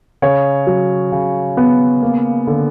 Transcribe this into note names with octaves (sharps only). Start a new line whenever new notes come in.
C#3 C#5
F#3
C#3
B3
A#3
D3